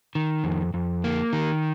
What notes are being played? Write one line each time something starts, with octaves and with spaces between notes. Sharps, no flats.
D#3
F2
F2
A#3
D#3